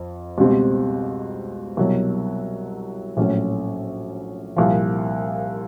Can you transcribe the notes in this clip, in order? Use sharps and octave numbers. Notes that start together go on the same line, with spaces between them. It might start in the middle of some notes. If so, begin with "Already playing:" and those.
Already playing: F2
C#2 B2 G3 C4
C2 B2 F#3
A#1 A2 F#3 A3 C#4
C2 A#2 F3